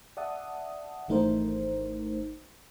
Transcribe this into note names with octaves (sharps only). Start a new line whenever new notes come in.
D5 E5 F#5 A5 D#6
G#1 E3 A3 D#4 A#4 C5